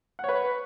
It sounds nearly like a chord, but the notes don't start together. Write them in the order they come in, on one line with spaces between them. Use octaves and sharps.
F#5 C#5 B4